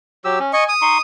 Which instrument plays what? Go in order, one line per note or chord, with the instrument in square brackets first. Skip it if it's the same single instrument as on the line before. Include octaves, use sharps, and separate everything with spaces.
[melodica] F#3 G4 E6
C#4
[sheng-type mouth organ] D#5 C#6 [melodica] G#5
[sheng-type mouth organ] D#6
[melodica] D#4 C6 C#6